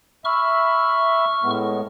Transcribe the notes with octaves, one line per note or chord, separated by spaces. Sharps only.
E5 B5 C#6 F6
A2 G#3 B3